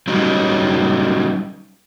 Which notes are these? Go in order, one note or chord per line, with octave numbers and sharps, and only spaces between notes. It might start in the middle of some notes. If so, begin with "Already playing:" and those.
F#3 G3 C#4 D#4